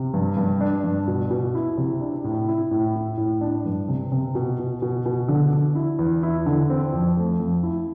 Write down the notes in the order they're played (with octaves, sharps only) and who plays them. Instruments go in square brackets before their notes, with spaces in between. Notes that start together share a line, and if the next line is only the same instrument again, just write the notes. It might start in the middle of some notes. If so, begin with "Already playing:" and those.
Already playing: [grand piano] C3
G2
G2
D4
G2
B2
B2
E4
C3
D4
A2
E4
A2
E4
A2
D4
G2
C3
C3
B2
B2
B2
B2
D3
D3
E4
E2
E4
D3
C4
F2
A3
F2
E4